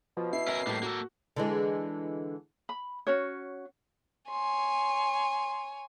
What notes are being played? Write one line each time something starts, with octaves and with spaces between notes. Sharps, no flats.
B2 F3
E4 C7
C#4 A#4 E5
A2 G3 A3 A#3
A#3 F#4 A4
D3 E3 G#3
B5
C#4 F#4 C#5
C#5 G#5 C6